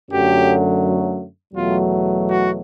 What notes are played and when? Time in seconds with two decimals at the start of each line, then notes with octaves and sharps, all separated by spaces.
0.10 F#2 D3 F#3 A3 G4
1.54 E2 B2 F#3 A3 F4
2.27 F#4